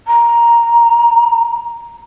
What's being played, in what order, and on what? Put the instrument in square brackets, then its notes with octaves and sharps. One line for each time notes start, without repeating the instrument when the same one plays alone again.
[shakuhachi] A#5